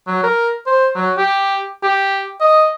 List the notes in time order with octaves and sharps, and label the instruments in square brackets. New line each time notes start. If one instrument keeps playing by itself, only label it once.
[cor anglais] F#3
A#4
C5
F#3
G4
G4
D#5